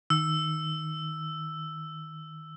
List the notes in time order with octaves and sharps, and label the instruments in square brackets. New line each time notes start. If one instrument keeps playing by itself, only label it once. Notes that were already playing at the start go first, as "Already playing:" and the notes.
[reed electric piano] D#3 [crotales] E6